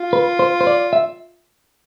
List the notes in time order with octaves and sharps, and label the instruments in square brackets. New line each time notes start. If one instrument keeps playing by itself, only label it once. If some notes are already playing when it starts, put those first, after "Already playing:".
Already playing: [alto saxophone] F4
[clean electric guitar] B4
C5
C5
D5
E5